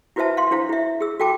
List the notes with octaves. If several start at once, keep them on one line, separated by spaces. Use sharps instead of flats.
E4 F#4 B4 C5 E5 A5
F5 C6
D4 E4 C5 F5
E4 E5
G#4 E6
F#4 A4 G5 A5 D6